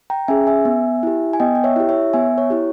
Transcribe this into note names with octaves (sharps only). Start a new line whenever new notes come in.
G5 A#5
C#4 G#4 E5 G#5
E5 G#5
B3
E4 G4
G#5
B3 D#5 G5
G5
C#5 E5
E4 G4
C#5 E5
B3 E5 G#5
C#5
E4 G4